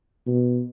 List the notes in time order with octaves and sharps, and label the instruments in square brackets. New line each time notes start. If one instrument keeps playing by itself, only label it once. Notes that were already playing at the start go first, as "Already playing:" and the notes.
[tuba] B2